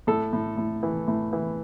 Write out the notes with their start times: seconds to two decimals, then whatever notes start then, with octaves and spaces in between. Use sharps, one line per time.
0.07 A2 A4
0.33 A2
0.57 A2
0.83 E3
1.08 A2
1.33 E3